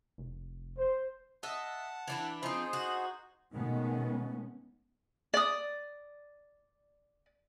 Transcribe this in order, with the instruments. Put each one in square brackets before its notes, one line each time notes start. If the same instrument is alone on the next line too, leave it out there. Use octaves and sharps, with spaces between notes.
[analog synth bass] F1
[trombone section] C5
[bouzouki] D#5 E5 [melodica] F#5 A5
[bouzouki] E3 D4 E4
[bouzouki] F3 C4 [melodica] D#4 G#4 C5
[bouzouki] F#4
[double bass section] B2 D#3 G#3 A3 B3 C#4
[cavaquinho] D5 D#6